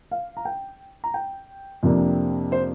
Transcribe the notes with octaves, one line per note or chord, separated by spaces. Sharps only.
F5
A#5
G5
A#5
G5
F2 C3 A#3 D4
C5